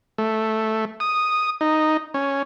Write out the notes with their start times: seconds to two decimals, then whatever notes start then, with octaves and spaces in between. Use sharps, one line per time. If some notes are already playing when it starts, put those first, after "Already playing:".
0.18 A3
1.00 D#6
1.61 D#4
2.14 C#4